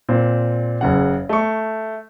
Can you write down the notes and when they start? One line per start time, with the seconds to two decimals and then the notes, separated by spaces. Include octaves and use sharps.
0.09 A#2 C4
0.81 F#1 C#3 F#5
1.29 A3 C#6